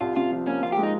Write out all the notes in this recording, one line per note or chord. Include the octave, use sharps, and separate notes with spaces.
C2 F4
C3 F4
F3
A#3 C#4
F3 F4
G4
G#3
D#4